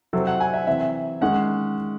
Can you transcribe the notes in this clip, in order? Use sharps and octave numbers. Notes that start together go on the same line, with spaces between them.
C3 F#3 C4 A4
F#5
G#5
E5
C3 E3 C4 E5
D#3 G#3 C#4 F#5